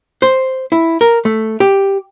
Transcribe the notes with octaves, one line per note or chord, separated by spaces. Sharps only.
C5
E4
A#4
A3
G4